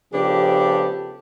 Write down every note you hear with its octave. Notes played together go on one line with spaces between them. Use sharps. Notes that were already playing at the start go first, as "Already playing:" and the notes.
C#3 F3 B3 D4 G4 A4